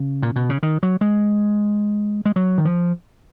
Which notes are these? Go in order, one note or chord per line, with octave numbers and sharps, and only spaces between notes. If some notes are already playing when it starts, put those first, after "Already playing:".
Already playing: C#3
A#2
B2
C#3
D#3
F#3
G#3
G#3
F#3
D#3
F3